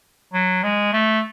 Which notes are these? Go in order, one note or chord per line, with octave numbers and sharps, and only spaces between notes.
F#3
G#3
A3